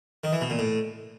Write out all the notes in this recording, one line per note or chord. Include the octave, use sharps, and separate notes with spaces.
D#3
E3
B2
A#2
A2